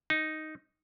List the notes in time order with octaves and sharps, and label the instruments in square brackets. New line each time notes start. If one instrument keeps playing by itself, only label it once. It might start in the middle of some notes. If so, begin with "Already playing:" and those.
[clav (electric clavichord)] D#4